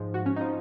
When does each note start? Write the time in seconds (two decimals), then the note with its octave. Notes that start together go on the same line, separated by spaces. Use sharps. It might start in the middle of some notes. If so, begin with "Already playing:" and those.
Already playing: G#2 F3
0.14 F#4
0.26 C#4
0.36 F3 D#4